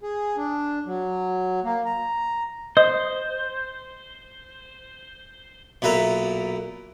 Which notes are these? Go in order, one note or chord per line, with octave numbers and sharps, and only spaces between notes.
G#4
D4
F#3
A#3
A#5
C5 D#5
B1 A#2 B4 E5 A#5